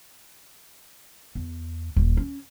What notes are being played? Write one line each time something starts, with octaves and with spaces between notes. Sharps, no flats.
E2
D#1
C#4